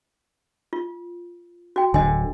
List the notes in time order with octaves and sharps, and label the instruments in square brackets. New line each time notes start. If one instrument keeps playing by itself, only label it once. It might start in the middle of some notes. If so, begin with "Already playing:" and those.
[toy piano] F4
F#4 G5
[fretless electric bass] D1 D3 [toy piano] D#5 G#5